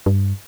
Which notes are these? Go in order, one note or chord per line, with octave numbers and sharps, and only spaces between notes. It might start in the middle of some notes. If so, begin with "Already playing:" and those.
G2